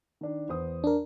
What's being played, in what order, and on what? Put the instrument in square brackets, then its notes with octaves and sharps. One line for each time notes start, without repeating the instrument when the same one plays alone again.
[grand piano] D#3 D4
E2 C5 D#6
[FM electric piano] D4 A#4